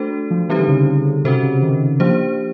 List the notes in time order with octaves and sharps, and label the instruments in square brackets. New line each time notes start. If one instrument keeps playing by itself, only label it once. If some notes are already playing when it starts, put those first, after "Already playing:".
Already playing: [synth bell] A3 D4 F#4 A4 C5
[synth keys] F3
[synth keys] E3 [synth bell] G3 C4 D#4 G4 C5
[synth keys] D3
C#3
C#3
[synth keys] C3 [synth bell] C#4 F#4 A4 C5
[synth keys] C#3
D#3
[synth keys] F3 [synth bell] A#3 D4 G4 C5